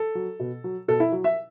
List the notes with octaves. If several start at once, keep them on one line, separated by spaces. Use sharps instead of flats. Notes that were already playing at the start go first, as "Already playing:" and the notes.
Already playing: A4
F#3
B2
F#3
B2 A4
E4
F#3
E5